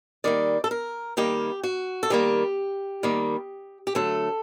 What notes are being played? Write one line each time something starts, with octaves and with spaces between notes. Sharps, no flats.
D#3 G3 A#3 D5
A4
A#4
D#3 G3 A#3 G4
F#4
A4
D#3 G3 A#3 G4
D#3 G3 A#3
G4
D3 F#3 A3 A4